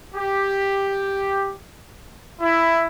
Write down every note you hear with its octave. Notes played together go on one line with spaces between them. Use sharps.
G4
E4